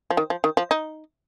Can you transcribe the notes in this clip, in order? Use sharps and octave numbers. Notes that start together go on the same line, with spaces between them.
F3
D#3
F3
D#3
F3
D#4